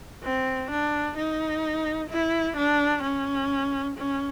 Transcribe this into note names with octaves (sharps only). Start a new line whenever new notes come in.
C4
D4
D#4
E4
D4
C#4
C#4